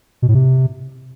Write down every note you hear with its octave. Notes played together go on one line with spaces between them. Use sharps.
B2
A2
C3